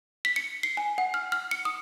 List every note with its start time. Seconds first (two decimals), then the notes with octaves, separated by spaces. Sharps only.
0.25 B6
0.36 C#7
0.63 C7
0.77 G#5
0.98 F#5
1.14 F6
1.32 F6
1.51 C#7
1.65 D#6